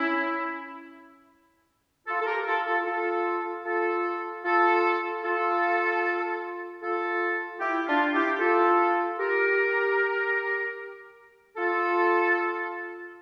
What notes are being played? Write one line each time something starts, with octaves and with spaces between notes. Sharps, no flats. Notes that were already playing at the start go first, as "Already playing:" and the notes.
Already playing: C#4 E4
F4 A4
A4
G4 A#4
F4 A4
F4 A4
F4 A4
F4 A4
F4 A4
F4 A4
F4 A4
E4 G4
D4 F4
E4 G4
F4 A4
G4 A#4
F4 A4